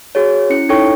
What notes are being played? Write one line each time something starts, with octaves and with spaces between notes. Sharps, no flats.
F#4 G#4 C#5
C#4 E4 C#7
D#4 E4 A4 C#5 G5 C#6